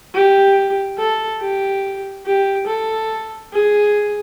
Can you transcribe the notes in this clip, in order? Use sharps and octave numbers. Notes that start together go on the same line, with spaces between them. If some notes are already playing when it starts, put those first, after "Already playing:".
G4
A4
G4
G4
A4
G#4